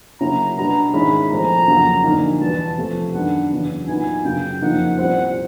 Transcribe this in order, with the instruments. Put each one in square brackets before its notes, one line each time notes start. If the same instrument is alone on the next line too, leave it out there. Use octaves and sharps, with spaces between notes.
[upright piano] C#3 F#3 A#3 C#4 E4 [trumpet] A#5
[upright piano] B2 G3 B3 D4 [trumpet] A#5
[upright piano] G#2 D#3 G#3 C#4 E4 [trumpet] B5
[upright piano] C2 A#2 F3 A3 C4 [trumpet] A#5
[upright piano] F2 C#3 F#3 A#3
D2 D3 F3 A#3 D#4
[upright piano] E2 B2 G3 B3 [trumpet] A5
[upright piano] C3 F3 A3
[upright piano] F#2 D#3 G3 B3 D4 [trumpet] F#5
[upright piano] E2 C#3 F#3
[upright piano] A#2 F#3 B3 D#4 [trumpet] G#5
[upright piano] F#2 C#3 F#3 [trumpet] G5
[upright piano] F2 C#3 F3 A#3 D#4 [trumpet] F#5
[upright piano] C2 A#2 G3 C4 [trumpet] F#5